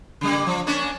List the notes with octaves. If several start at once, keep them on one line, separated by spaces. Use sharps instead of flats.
C#3 G3 A#3
F3
A#3 C#4 D4